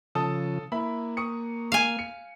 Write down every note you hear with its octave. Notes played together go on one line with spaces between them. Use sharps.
C#3 F3 A4 A5 D#6
A#3 E4 E5 B5
C#6 D#6 C#7
F5 G#5
C#7